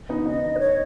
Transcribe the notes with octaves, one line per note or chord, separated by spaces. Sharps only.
B3 D#4
B3 D#4 D#5
B4
C#5